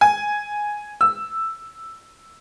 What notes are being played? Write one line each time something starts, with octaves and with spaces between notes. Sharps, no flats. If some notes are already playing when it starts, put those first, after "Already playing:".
G#5
E6